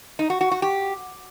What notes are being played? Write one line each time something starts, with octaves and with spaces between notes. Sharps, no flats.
D#4
F#4
F#4
F#4
G4